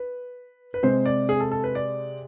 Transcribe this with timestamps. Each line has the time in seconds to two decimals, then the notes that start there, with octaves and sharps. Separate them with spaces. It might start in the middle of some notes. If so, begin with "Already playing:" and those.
Already playing: B4
0.74 B4
0.83 C3 G#3 C4 C5
1.06 D5
1.29 G#4
1.40 A4
1.52 A4
1.64 B4
1.75 D5